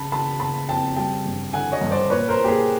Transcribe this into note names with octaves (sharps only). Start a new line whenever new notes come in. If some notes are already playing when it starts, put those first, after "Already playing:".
Already playing: C#3 A5 B5
C#3 A5 B5
C#3 A5 B5
F2 G5 A5
G3 G5 A5
G2
D3 F#5 G#5
C#5 D#5
G2
C5 D5
A#2 B4 C#5
A#4 C5
A#2
G4
G#4